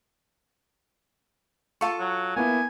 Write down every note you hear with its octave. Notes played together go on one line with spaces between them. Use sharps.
F4 A4 C#6
F#3
A#3 B3 E4 G#5